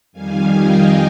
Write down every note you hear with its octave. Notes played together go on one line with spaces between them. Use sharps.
F2 D#3 G3 F5 G#5
D#5 G5